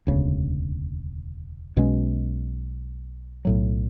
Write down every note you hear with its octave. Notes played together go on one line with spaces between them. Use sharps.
E1 D2 C#3
B1 B2 G#3 C#4
B1 A2 F#3